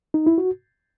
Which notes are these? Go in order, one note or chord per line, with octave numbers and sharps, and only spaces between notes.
D#4
E4
F#4